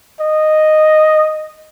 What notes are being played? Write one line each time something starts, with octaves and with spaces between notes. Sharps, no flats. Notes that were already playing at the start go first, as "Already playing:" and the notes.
D#5